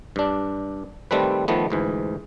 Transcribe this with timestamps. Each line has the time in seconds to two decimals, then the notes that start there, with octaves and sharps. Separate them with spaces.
0.16 G2 D4
1.11 D#3 G3 A3 C4 B4
1.48 D#3 F3 A3 B3
1.70 D2 G#2 E3